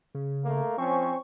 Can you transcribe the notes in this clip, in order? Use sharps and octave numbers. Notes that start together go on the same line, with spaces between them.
C#3
A3 A#3
F3 C4 C#4 C#6